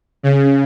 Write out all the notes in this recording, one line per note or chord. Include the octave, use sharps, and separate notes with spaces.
C#3